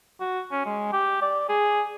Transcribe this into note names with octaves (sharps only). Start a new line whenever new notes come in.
F#4
C#4
G#3
G4
D5
G#4